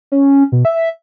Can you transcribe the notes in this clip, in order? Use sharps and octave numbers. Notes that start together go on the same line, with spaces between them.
C#4
B2
E5